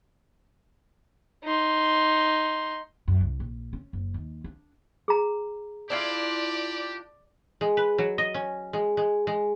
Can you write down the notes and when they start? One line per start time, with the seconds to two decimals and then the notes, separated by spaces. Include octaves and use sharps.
1.44 D#4 C6
3.08 F#2
3.21 C2
3.40 A#1
3.73 C#4
3.93 F#1
4.14 D#2
4.44 D4
5.08 G#4 A#5
5.90 D4 E4 F4 G4 D5
7.61 G#3
7.77 B4
7.98 F#3
8.18 D#5
8.34 C#4
8.73 G#3
8.97 G#3
9.27 G#3